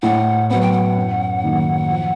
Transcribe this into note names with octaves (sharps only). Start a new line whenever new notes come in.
A2 F#5
F#3 B3 F#5
G5
F#5
F#2
D#3 F#3 A#3 D#4
F3